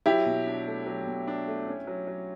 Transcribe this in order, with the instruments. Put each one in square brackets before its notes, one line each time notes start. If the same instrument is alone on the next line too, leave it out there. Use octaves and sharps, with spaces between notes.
[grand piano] F#3 [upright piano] E4 G4
[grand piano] B2
D4
A3
F#3
B2
D4
A3
C#4
F#3
F#3